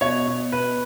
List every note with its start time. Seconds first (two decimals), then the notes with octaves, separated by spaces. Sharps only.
0.01 B2 C#5
0.28 B2
0.52 B2 B4